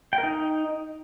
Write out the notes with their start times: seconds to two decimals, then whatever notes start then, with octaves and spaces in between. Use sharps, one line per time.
0.13 G5
0.18 A#4
0.23 D#4